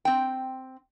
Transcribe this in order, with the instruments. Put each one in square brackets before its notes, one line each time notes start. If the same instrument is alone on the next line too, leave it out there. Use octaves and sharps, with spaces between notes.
[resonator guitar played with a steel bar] C4 G5